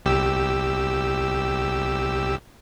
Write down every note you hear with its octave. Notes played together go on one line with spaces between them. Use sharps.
C2 G4 E6